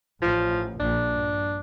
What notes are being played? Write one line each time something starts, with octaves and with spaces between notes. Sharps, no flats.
A1 A2 F3
A#1 A#2 D4
G2